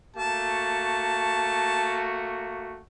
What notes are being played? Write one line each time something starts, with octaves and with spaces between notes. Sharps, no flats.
A3 A#3 F#4 A5